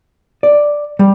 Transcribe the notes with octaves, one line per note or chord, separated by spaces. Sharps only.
D5
G3